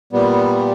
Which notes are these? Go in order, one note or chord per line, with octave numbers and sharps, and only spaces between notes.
A#2 G3 B3